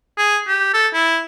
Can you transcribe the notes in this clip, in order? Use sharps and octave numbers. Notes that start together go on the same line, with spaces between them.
G#4
G4
A4
E4